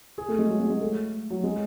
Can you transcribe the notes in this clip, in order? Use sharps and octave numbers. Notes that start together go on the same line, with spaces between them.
G#4
A3
G#3
F#3
G#3
G#3
A3
F#3
G#3